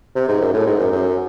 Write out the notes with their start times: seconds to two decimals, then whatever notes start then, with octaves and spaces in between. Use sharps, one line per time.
0.15 C3
0.28 G#2
0.41 F#2
0.54 A2
0.67 G#2
0.80 F#2
0.92 F#2